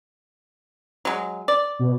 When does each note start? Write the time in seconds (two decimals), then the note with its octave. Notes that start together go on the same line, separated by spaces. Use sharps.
1.05 F#3 G#3
1.48 D5
1.79 B2